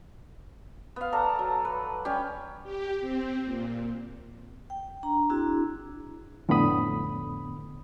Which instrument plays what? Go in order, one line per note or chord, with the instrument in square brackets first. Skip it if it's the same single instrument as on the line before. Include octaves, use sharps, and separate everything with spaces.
[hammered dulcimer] B3 F5
A4 D5 A#5
F#3
B4
G3 C#4 G4
[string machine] G4
C4
A#2
[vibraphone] G5
D4 A#5
C4 D4 E4 F#4 G#4
[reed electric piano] F2 A2 D3 B3 B5 D#6